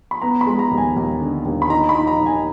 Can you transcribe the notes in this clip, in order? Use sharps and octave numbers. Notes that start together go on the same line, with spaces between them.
B5
B3 A#5
B5
G#3
A#5
D#2
G#5
D#2
D3
D#2
B5
D#4 A#5
B5
D#4
A#5
D#4
G#5